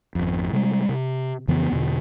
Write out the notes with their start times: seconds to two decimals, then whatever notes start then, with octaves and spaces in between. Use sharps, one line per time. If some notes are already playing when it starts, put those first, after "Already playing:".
0.15 G#1 F2
0.53 C3 G3 G#3
0.89 C3
1.48 F2 C#3 E3 B3
1.72 E2 B2 D3